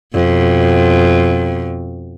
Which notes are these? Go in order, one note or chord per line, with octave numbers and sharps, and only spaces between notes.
F2 B2